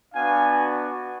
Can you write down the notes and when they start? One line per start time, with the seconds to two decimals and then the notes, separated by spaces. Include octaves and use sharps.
0.14 B3 D4 F#4 F5 G#5